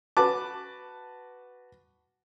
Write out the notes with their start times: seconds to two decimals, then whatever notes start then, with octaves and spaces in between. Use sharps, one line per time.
0.17 F#4 B4 A5 D6